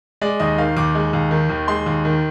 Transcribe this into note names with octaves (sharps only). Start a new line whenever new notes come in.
G#3 D5
D#2 D#5
D#3 F5
D#2 D6
G#3
D#2
D#3
D#2
G#3 C6
D#2
D#3